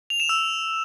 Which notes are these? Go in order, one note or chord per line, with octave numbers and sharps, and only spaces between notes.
F7
E7
E6